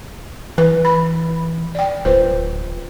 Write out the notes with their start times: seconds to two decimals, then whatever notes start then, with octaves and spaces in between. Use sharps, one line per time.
0.58 E3 B4
0.85 B5
1.75 D5 G5
2.05 D1 F4 B4 C5